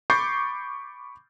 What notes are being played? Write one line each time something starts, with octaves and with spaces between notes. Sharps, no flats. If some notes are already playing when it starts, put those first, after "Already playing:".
B5 C#6 D6 G6 A6 C7